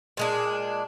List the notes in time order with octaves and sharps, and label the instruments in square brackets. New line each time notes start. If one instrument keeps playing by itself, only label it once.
[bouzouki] A#2 G#3 D4